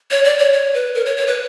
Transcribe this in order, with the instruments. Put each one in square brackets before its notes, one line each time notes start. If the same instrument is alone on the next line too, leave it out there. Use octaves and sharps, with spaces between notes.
[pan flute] C#5
D5
C#5
C#5
B4
A#4
C#5
C#5
B4